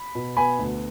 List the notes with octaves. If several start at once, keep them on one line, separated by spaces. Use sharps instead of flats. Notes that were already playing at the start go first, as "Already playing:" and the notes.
Already playing: B5
B2
B3 G#5 B5
D2